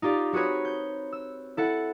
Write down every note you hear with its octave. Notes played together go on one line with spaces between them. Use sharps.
D#4 F4 G4 D5
C4 F#4 G#4 B4 C#5
G6
E6
E4 A4 F#5